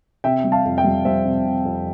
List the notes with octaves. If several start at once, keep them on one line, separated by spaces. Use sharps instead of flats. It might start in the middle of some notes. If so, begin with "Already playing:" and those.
C3 E5 G5
G3
F5 A5
F2
E5 G5
G3
G3 C5 E5
C3
C3
F2